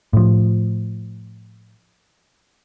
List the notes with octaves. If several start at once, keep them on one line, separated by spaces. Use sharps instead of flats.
A2 F3